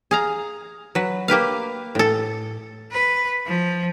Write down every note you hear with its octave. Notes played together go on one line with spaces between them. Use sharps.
G#4 F5 A#5
F#3 B4
A#3 G4 B4 F5
A2 A4
B4
F3